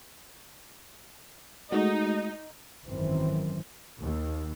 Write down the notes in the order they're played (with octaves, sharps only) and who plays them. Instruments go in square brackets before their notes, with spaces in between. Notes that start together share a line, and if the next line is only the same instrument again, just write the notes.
[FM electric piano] G#3 A3 F#4 [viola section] D#4
[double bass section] G#1 F#2 D#3 E3 C4
D#2